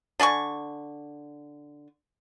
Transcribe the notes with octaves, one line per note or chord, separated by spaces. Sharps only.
D3 D5 G#5 C#6